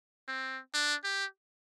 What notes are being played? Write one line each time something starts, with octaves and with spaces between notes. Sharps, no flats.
C4
D4
G4